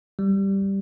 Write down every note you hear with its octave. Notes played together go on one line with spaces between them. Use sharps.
G3